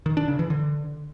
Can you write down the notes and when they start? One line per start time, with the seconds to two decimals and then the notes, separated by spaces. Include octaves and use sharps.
0.06 D#3
0.17 D4
0.28 C#3
0.39 E3
0.50 D3